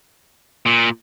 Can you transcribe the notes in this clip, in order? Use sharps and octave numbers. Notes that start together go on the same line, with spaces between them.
A#2